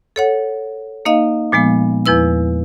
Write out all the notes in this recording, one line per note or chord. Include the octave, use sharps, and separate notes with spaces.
A4 C#5 F#5
A#3 D#4 D#5 F5
A#2 F3 G#3 B3
E2 F3 E4 B4 E6